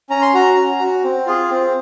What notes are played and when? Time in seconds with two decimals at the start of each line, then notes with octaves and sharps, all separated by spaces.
0.10 C#4 A#5
0.22 C6
0.34 F#4 A#5
0.57 C#4
0.79 F#4
1.03 C4
1.26 F4 G#4
1.50 C4